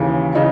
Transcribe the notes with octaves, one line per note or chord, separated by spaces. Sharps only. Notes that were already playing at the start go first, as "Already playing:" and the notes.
Already playing: D#2 C#3 E3
C#3 E3 D#4